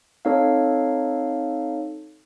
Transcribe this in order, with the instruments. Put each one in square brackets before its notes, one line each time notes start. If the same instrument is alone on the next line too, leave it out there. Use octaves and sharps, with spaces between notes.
[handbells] C4 D#4 A4 C#5 F5